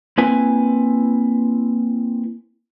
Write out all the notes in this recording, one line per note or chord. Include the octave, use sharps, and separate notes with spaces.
A#3 C4 E4 B4 G#5